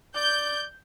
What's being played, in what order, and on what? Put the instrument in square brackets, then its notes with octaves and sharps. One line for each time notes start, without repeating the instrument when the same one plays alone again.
[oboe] D5 [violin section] G6